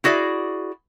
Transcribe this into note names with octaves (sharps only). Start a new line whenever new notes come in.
E4 F#4 G#4 D5